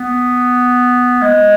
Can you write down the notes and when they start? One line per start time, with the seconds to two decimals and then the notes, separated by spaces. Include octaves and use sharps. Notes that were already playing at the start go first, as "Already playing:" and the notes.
Already playing: B3
1.22 G#3